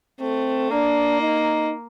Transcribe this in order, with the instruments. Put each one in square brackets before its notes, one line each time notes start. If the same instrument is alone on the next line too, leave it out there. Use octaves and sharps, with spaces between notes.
[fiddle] A3 [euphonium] C4
[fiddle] A#3 [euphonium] D4
[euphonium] D#4